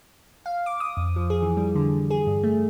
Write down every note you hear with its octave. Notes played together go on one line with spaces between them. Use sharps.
F5
D6
D#6
F2
F3
G#4
E3
G3
D3
G#4
G2
A3